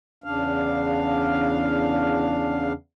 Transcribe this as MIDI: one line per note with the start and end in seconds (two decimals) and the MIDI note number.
0.24 2.73 40
0.24 2.73 49
0.24 2.73 62
0.24 2.73 77